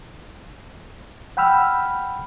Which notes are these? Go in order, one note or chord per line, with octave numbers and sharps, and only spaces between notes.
F#5 G5 B5 E6 F6